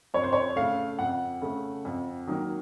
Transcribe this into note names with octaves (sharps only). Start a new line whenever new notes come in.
F2 C#5
C5
C#5
C#3 A3 F5
F2 F#5
C#3 A3
F2
D#3 F#3 A#3